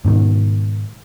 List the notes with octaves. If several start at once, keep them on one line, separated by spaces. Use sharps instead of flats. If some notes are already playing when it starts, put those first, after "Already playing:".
G#2 B2 D#3